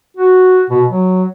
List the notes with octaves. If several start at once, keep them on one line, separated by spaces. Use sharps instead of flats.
F#4
B2
F#3